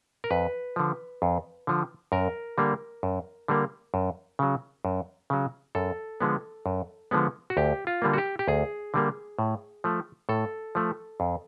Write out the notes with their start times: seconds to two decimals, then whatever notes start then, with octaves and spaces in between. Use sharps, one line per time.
0.24 A#4
0.31 F2 B4
0.76 D3 F3
1.22 F2
1.67 D3 F3
2.12 F#2 A#4
2.58 D3 G3 A#3
3.03 F#2
3.48 D3 G3 A#3
3.94 F#2
4.39 C#3 F#3
4.85 F#2
5.30 C#3 F#3
5.75 F#2 A4
6.20 D3 F3 G#3 B3
6.66 F#2
7.11 D3 F3 G#3 B3
7.50 F#4
7.57 D2 G4
7.87 F4
8.02 D3 G3 A#3
8.14 F#4
8.18 G4
8.39 G4
8.48 D2 G#4
8.94 D3 G3 A#3
9.39 A2
9.84 F3 A3
10.29 A2 A4
10.75 F3 A3
11.20 F2